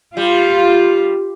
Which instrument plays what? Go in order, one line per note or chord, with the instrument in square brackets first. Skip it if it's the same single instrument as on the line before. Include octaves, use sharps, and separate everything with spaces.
[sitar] G3 [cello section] F4